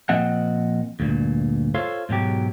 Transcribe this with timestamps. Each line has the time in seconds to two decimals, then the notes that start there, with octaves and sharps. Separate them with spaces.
0.09 A#2 F3 C4 D#5 F#5
1.00 D2 G2 A#2
1.74 F4 A4 C5 C#5 F5
2.09 G#2 B2 F#3 G4